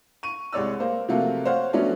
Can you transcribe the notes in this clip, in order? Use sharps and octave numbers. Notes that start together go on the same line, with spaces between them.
C#6 D#7
C2 G#3 C#5 D5 E6
A#3 C5
C3 F3 F#3 A3 A#3 F#4
C5 C#5 F5 F#5
F3 F#3 A3 B3 C#4 D4